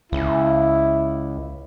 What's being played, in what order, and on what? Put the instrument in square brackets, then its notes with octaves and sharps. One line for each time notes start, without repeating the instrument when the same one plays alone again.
[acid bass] C#2 [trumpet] E4